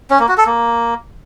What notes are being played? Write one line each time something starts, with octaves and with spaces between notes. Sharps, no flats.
C#4
A#3
F#4
A4
A#3